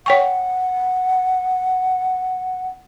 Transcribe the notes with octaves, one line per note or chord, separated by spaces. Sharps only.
C#5 F#5 G5 C#6